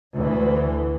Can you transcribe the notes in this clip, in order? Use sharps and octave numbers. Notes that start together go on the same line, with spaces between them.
D2 E3